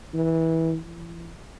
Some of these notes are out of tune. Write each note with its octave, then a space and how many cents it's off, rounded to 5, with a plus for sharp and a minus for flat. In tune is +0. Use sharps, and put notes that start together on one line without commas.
E3 -20
E3 +35